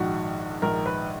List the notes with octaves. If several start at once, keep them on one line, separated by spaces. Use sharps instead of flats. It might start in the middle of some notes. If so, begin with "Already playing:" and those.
Already playing: A#1 G#2 D#3 F#4
A#1 G#2 D#3 A#4
B4